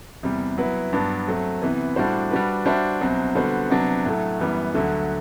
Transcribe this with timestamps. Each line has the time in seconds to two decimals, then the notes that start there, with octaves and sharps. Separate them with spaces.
0.23 E2 C3 G3
0.58 F#3 B3 E4 B4
0.93 G2 F#3 B3 D4
1.28 F#3 A3 C4
1.62 C3 E3 B3
1.96 A2 G3 D4 F#4 C5
2.31 G3 D4 F#4 B4
2.66 G3 D4 F#4 C5 E5
3.01 C2 B2 F#3 C4
3.35 D3 G3 B3 F#4 C5
3.70 C3 F#3 B3 D4
4.05 A2 F#3 A3
4.39 F#2 E3 G3 B3
4.75 D2 D3 F#3